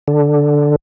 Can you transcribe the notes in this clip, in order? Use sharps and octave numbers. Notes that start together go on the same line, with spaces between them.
D3